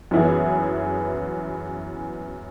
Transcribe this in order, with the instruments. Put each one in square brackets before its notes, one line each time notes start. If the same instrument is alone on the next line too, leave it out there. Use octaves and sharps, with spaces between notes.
[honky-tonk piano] F#2 E3 B3 E4 G#4